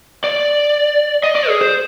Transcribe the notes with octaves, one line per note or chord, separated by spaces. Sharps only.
D5
D#5
D5
G#4
C5